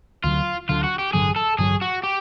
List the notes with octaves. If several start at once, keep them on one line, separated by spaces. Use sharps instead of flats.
D2 D3 F#3 F4
D2 D3 F#3 F4
F#4
G4
A1 G2 D3 F#3 G#4
A4
A1 G2 D3 F#3 G#4
F#4
G4